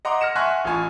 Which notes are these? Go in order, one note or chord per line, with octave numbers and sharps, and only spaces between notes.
D#5 F#5 A#5 C6 D6
F6 A#6 C#7 E7
E5 F#5 G#5 C6 C#6 F#6
A1 F4 G#5 C#6